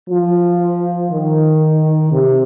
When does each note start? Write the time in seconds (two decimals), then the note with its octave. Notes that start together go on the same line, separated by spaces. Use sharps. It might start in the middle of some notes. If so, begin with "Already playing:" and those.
0.10 F3
1.10 D#3
2.10 C3